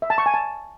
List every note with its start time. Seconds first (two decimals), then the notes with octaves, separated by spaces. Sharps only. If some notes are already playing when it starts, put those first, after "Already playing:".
0.02 E5
0.10 A5
0.18 C#6
0.26 G#5
0.34 A5